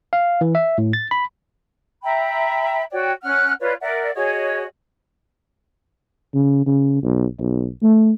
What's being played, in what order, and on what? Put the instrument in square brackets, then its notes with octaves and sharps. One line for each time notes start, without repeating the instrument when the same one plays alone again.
[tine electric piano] F5
E3
E5
A2
A6
B5
[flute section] E5 G5 A#5 B5
F#4 C#5 D5 G5
C#4 F#5 F6 F#6
F4 B4 C#5 D5
A#4 D5 E5 F#5
F#4 G#4 C#5 D#5
[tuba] C#3
C#3
B1
B1
A3